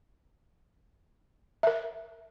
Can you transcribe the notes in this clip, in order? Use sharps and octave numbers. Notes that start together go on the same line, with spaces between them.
A#4 E5